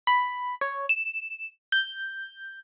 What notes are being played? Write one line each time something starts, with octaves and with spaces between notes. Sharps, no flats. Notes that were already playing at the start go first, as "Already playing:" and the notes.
B5
C#5
E7
G6